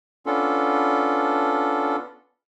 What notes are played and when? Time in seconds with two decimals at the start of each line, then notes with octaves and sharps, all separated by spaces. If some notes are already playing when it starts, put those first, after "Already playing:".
0.26 B3 C#4 D4 F4 A4